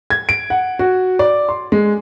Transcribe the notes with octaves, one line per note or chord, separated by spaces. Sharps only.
G#6
D7
F#5
F#4
D5
C6
G#3